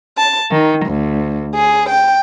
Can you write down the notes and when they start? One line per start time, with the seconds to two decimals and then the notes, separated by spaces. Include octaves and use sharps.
0.17 A5
0.50 D#3
0.85 D2
1.54 G#4
1.89 G5